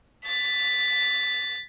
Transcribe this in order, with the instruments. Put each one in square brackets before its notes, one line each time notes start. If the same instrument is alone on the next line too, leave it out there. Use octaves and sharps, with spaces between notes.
[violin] A6 B6